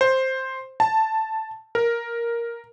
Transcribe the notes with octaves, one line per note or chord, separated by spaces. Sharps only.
C5
A5
A#4